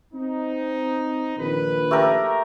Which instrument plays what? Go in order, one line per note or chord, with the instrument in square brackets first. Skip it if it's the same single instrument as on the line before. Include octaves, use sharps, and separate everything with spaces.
[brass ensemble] C4 D#4
A#1 D#3 B4
[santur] A3 G4 A#4